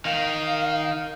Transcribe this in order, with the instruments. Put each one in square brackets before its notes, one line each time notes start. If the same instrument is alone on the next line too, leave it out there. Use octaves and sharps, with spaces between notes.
[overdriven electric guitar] D#3 [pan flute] F5